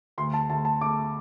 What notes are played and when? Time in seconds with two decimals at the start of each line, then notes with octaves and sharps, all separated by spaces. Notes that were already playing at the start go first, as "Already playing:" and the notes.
0.18 D2 C6
0.34 A5
0.49 D2 A5
0.65 A5
0.81 A3 D6